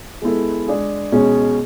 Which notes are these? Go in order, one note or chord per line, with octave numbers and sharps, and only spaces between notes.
G#3 B3 E4 A4
G#3 D4 G#4
B2 G#3 C#4 G#4